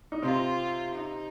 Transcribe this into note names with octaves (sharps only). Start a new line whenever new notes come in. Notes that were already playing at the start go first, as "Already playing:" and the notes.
D#4
C3 C4 F4
D#4